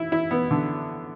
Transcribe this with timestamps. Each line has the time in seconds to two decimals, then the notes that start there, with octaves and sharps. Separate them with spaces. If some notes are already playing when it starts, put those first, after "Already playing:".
Already playing: E4
0.12 E4
0.31 B3
0.51 D3